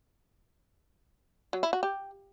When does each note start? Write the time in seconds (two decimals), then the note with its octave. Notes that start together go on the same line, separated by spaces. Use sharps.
1.53 F#3
1.63 E4
1.73 F#4
1.83 G4